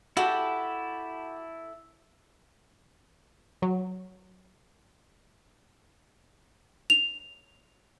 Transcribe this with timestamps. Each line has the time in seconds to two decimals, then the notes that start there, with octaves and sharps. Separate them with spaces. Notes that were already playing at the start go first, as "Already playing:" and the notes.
0.17 E4 F#4 G4 A4 A5
3.62 F#3
6.90 F7